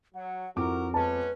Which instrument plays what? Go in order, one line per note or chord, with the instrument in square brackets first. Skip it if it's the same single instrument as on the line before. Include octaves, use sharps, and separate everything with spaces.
[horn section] F#3 [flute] F#5
[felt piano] F2 D6 [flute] E4 [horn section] F#4 A#4
[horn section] G#3 B3 C#4 [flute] B4 [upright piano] A5